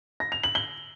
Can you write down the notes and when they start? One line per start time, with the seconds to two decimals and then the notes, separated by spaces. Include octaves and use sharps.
0.20 A#6
0.32 F7
0.43 F#7
0.55 G7